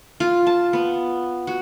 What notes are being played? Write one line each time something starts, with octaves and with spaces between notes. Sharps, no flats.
F4
A5
B3
F#4